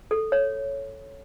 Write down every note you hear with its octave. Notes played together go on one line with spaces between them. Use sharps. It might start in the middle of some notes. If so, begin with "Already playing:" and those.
A4
C#5